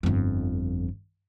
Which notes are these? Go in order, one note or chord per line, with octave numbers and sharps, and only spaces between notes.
G1 F2